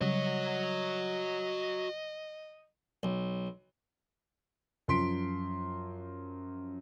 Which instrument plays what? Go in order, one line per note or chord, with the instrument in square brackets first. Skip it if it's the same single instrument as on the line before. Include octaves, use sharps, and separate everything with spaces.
[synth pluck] C#3 F#3 G3 [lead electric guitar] F#4 C#5 [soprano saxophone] D#5
[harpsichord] B1
[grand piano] F#2 F3 C6 B6 D7